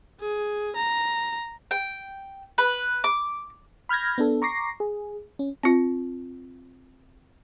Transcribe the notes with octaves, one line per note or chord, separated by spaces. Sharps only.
G#4
A#5
G5
B4
D6
B5 F6 G6 G#6 A#6
B3 D4 A4
A#5 C#6 D6 A#6 C7
G#4
C#4
C4 F4